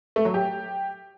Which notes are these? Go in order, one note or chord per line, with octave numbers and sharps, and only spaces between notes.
A3
F#3
G4